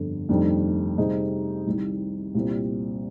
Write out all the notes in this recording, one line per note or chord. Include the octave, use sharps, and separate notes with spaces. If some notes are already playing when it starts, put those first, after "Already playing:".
Already playing: G1 F2 D3
F1 F2 D#3 G3 D4
C3 G3 C4 D#4 G#4
C2 C3 D#3 G3
C2 A#2 G3 C4